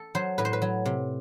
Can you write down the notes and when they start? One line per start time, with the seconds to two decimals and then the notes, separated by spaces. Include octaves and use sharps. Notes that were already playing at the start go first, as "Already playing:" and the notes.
Already playing: A4
0.15 F#3 C5
0.38 A2 B4
0.45 C5
0.53 B4
0.62 F#3
0.86 C3